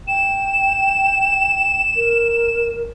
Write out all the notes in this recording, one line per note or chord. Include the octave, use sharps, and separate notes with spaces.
G5 E7
A#4